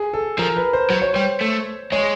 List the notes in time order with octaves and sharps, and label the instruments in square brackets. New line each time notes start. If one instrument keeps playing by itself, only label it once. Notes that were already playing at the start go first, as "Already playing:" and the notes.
Already playing: [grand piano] G#4
A4
[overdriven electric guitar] F3 [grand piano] A#4
[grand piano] B4
C5
[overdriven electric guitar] F#3 [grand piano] C5
[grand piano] C#5
[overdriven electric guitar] G3 [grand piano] C5
[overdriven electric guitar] A3
[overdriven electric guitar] G#3 [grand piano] C#5